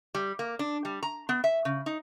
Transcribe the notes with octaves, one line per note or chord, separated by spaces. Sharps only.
G3
A#3
D4
G3
A#5
B3
E5
C#3
D#4